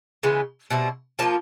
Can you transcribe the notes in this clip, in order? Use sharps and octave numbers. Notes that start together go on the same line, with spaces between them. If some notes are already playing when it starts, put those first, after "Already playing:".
C#3 E3 G#3 B3
B2 G3 C4 E4
F3 A#3 F4 A5